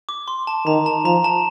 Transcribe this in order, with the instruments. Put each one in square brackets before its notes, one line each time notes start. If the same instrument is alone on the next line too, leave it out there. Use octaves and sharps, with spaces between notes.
[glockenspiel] D6
C6
A5
[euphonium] D#3 [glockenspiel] A#5
[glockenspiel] A5
[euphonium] F3 [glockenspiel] A#5
[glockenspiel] A5